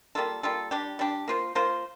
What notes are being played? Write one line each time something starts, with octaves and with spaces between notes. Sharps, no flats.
G3 A#3 F4 A4
G3 A#3 F4 A4
G3 D4 G4
G3 D4 G4
A#3 F4 C5
A#3 F4 C5